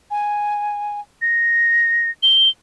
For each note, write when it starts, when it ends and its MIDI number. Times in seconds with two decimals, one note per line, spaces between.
0.11 1.00 80
1.22 2.10 94
2.23 2.49 103